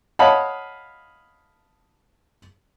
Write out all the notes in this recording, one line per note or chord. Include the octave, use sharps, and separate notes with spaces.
C#5 D#5 F5 F#5 A5 B5